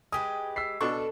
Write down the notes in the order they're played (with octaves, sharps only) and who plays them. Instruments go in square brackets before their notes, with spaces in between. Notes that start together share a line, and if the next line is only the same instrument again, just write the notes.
[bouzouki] G#3 G4 B4 [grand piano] D#6
[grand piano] E6 B6 C7
[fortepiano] B2 D4 C#6 [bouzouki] A4